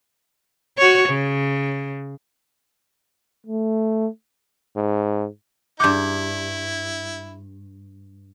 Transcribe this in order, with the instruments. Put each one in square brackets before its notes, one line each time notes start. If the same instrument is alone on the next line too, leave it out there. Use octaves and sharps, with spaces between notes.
[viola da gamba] F#4 C#5
C#3
[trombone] A3
[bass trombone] G#2
[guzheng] G2 F#5 [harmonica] E4 [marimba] D6 G6